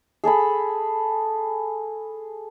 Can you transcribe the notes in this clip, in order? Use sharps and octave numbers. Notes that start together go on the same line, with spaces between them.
G#4 A4 G#5 B5